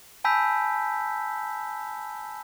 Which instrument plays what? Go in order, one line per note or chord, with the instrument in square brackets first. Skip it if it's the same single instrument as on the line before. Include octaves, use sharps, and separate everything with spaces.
[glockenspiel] G#5 A5 B5 E6 G6 B6